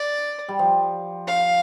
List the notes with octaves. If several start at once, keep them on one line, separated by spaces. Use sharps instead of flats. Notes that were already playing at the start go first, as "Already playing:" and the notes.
Already playing: D5
G3
F3
F5